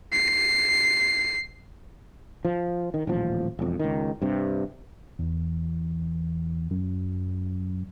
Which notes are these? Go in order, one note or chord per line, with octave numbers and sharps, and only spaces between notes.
C7
F3
D#3
D#1 A1 F3
E1 F2
C#2 D#3
G2 C3
E2
F#2